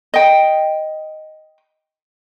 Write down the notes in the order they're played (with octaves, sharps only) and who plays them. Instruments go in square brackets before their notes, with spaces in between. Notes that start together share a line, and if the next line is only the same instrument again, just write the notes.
[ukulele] D#5 G5